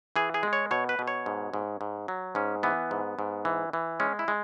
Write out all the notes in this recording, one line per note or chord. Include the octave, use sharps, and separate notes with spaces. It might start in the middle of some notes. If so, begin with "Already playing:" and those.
E3 G#4
G#4
G#3
C#5
B2 C#5
B4
B2
C#5
G#2
G#2
G#2
F#3
G#2 C#4
E3 B3
G#2
G#2
E3
E3
G#3 C#4
E4
G#3